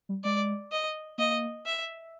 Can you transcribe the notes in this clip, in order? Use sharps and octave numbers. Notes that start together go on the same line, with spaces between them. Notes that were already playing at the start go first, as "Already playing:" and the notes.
G3
G#3 D5
D#5
A#3 D#5
E5